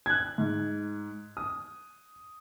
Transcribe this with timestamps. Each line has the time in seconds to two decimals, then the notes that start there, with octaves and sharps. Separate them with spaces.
0.06 F#6 G#6
0.38 G#2
1.37 D#6